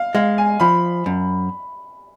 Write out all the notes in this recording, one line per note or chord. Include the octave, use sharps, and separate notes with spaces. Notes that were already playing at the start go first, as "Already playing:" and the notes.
Already playing: F5
G#3 F5
G#5
F3 B5
F#2